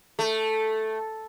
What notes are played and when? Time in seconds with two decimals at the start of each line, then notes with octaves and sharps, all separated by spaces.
0.19 A3